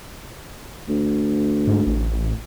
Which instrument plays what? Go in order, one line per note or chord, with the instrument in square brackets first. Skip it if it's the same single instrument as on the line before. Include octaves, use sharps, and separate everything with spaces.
[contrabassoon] D2
[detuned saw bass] G#2
A1